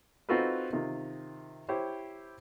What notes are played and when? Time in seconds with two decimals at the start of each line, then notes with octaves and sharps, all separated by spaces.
0.29 C4 D#4 F4 F#4 A4 B4
0.73 C3 D#3 F4
1.69 E4 G4 C5 C#5